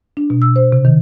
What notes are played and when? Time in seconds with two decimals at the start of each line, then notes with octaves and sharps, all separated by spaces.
0.17 D4
0.30 B2
0.42 E6
0.56 C5
0.72 C3
0.85 D#3